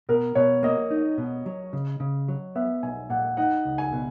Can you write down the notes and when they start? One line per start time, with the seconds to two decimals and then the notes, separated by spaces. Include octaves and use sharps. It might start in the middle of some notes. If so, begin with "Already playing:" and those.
0.09 B2 A#4
0.35 B2 C#5
0.63 A#3 D#5
0.90 D#4
1.18 B2
1.46 F#3
1.73 C#3
2.00 C#3
2.28 F#3
2.56 B3 E5
2.83 B1 G#5
3.10 A#2 F#5
3.37 D#4 F#5
3.65 C#2
3.78 G#5
3.92 B2